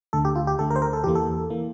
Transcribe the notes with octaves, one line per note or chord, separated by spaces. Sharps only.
D2 D3 A3 A4
G4
F4
G4
D2 D3 A3 A4
A#4
C5
A#4
A4
E2 E3 A#3 G4
A4
E3 A#3